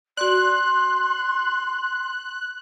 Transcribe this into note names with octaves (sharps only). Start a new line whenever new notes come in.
F#4 D5 C6 F#6